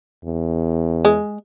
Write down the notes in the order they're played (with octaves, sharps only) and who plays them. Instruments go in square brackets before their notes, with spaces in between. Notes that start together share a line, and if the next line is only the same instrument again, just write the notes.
[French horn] E2
[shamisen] G#3